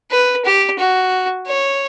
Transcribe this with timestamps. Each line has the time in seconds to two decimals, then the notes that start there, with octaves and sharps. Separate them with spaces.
0.11 B4
0.45 G4
0.79 F#4
1.47 C#5